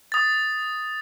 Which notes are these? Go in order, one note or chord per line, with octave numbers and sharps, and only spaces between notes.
D#6 A6